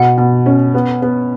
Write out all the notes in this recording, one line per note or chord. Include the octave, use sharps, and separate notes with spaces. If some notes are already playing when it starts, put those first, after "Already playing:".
Already playing: B2 F#5
B2
C#4
B3
B3